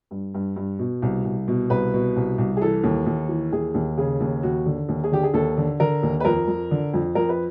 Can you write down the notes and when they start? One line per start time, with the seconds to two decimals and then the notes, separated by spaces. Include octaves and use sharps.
0.11 G2
0.34 G2
0.56 G2
0.79 B2
1.02 C2
1.25 C2
1.48 B2
1.70 C2 B4
1.94 B2
2.16 C2
2.38 C2
2.57 G#4
2.62 E3 A4
2.84 D#2
3.06 D#2
3.29 E3
3.52 D#2 G#4
3.74 D#2
3.97 C#3 G#4
4.21 D#2
4.43 D#2 F#4
4.66 D3
4.89 D#2
5.04 G#4
5.12 D3 G4
5.23 G#4
5.34 D#2 A4
5.57 D3
5.80 D3 A#4
6.03 D#2
6.20 B4
6.25 F2 A#4
6.48 F2
6.71 D3
6.94 F2
7.15 F2 A#4
7.29 B4